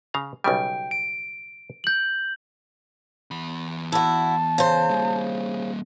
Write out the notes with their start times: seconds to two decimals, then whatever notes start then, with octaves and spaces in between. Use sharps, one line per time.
0.14 C#3 F5 A#5
0.44 B1 C#3 G3 G5
0.91 D7
1.84 G6 F#7
3.31 E2 B5
3.92 E4 F#4 A5
4.58 C#3 C5
4.90 G3 A#3